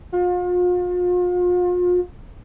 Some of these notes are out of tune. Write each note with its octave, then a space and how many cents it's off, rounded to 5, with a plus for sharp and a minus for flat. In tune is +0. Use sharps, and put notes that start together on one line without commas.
F4 +40